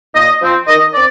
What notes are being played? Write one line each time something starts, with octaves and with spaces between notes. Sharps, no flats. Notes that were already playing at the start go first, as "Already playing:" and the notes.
A#2 D#5
F3 C4
D#3 D#5
C4 D5